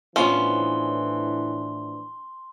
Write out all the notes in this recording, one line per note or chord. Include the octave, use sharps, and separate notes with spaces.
A2 E3 F3 B3 C#4 D4 C6 G7